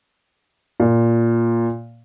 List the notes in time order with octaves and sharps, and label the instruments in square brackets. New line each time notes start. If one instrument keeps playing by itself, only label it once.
[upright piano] A#2